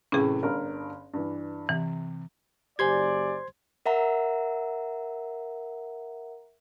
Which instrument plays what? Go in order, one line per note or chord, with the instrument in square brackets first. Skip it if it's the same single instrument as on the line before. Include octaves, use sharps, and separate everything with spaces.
[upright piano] A2 C3 E3 [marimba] C#4 G#4
[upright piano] G1 G2 A#4
G2 E3
[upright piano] C3 [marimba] E3
[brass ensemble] F#1 D5 [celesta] G4 G#5 [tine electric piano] C5 C6 G#6
[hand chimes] A#4 E5 F#5 A#5